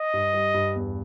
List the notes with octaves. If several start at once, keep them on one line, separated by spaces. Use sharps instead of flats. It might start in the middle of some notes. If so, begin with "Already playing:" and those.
Already playing: D#5
G2
G3
G2
E2